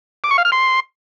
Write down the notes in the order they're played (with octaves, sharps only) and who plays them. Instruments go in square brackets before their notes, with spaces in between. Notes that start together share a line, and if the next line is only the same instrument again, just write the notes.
[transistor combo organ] D6
C#6
F5
F6
C6